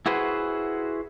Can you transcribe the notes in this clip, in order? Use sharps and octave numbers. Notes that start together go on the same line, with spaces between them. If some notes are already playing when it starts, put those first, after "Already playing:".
E4 F#4 G#4 B4 C5